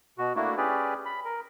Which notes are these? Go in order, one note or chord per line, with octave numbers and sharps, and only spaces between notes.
B2 F#4
A3 A#3 D4 E4 F#4
C#4 G4 G#4 B4 D5
B5
A#4